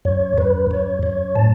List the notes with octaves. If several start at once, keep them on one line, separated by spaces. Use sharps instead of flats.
F#2 C#5
F#2 B4
F#2 C#5
F#2 C#5
A2 A5